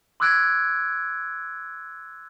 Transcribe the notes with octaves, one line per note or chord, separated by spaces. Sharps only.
C6 D6 E6 F#6 G#6 D7